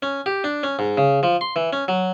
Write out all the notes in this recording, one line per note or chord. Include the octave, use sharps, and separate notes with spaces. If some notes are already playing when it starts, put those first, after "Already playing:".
C#4
G4
D4
C#4
G#2
C#3
F3
C6
E3
C#4
F#3